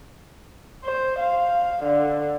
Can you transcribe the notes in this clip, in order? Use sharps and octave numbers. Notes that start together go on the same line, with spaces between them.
C5
F5
D3